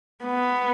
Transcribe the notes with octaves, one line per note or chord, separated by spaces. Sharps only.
B3